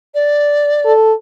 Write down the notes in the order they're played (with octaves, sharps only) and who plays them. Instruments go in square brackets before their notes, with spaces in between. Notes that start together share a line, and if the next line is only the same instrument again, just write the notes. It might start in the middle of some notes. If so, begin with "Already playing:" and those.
[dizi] D5
[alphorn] A4